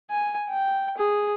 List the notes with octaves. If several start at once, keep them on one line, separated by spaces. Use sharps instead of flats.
G#5
G5
G#4